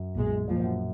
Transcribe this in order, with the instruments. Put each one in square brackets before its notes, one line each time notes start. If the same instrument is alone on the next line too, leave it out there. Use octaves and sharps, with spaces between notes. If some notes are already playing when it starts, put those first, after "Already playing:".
Already playing: [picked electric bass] F#2
[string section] B1 A#2 G#3
[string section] A#1 A#2 F3 [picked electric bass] F2
[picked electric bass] F2
F#2